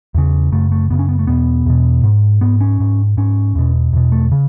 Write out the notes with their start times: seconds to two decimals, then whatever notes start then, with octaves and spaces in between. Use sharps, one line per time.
0.14 E2 C#3
0.52 F#2 C#3 A3
0.72 A3
0.90 F#2 C#3 B3
0.99 C#4
1.09 B3
1.19 A3
1.27 E2 B2 B3
1.66 E2 B2
2.03 G#2
2.41 G#2 B3
2.61 C#4
2.80 G#2
3.17 G#2 C#4
3.55 E2 B2
3.93 E2 B2
4.12 A3
4.32 C#3